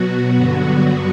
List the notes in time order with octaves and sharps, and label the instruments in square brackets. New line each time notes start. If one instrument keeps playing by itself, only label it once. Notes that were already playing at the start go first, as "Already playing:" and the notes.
Already playing: [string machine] B2 F#3 B3 F#4
G2 D3 F#3 B3